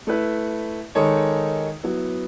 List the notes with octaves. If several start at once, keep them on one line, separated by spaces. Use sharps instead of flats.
A3 E4 B4
D#3 G#3 D#4 A4 C#5
F#3 B3 E4